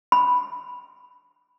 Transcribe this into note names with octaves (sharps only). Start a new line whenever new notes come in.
B5